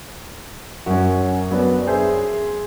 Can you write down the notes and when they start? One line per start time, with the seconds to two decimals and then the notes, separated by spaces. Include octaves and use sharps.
0.86 F#2 C#4 F#4
1.51 F#3 B3 D4
1.87 G#4 C5 E5